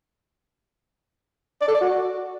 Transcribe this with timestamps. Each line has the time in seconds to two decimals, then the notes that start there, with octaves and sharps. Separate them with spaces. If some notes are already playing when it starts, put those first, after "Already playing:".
1.61 D5
1.68 A4
1.74 D5
1.81 F#4